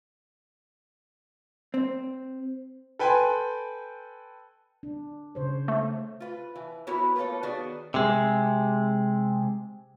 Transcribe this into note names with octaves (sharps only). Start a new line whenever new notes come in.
C4
A4 B4 G5 G#5 B5 C6
D4
C#3 C5 C#5
A3
F4 B4
E3
B3 E4 F#4 A#4 B4 C#5
A3 A#3 F4 A4 C#5
D#3 B3 F#4 G#4 D5
C3 G#3